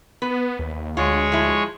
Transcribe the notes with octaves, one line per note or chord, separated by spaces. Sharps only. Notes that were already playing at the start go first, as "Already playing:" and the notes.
B3 B4
D#2
D2 G#3 F4 C#5
F3 E4